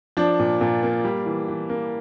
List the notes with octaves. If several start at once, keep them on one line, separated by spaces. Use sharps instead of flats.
F3 D4 D5
A#2
A#2
A#3
G3
E3
E3
A#3